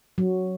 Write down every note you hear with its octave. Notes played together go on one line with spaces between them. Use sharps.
F#3